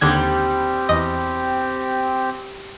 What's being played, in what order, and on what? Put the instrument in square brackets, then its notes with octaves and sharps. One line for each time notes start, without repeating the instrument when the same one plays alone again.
[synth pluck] D#2 D3 G#6 [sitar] G3 [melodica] C4 G4
[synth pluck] E2 D#5